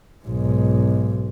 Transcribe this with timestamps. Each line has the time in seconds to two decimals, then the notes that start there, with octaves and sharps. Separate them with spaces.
0.25 B1 G#2